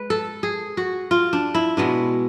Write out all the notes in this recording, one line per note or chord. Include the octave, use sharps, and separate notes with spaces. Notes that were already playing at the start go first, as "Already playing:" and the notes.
Already playing: G#3 B4
A4
G#4
F#4
F4
D4
E4
B2 G#3 B3 D4